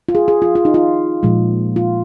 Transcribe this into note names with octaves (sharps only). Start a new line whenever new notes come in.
F4
G#4
G#4
F4
F4
D#4
F4
A#2 F3 G#3
F4